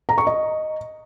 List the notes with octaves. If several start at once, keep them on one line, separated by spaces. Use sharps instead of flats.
A#5
C#6
D#5